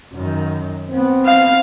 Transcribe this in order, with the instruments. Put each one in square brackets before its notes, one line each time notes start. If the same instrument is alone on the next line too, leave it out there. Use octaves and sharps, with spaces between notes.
[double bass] F#2 D#3
B3 C4
[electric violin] F5